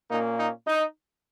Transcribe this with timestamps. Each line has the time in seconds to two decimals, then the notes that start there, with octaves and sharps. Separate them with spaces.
0.11 A#2 A#3 C#4 D#4
0.39 D#4
0.68 D#4